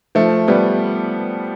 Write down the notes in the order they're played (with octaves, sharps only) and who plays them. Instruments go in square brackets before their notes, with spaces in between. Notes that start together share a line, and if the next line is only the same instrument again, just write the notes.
[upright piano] F3 A3
G3 B3